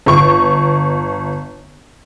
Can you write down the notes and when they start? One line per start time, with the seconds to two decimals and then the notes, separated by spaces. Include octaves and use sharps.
0.06 G1 C#6